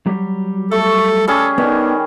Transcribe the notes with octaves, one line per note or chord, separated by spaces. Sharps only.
F#3 G3
A3 A4
G3 C#4 G#4 A4
D#3 B3 D4 D#4